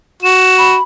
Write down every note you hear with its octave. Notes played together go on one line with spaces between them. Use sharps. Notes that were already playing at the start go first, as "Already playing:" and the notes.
F#4 E7
B5